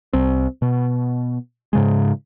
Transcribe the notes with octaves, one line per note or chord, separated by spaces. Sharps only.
C2 C4
B2
G#2 C#3 G#3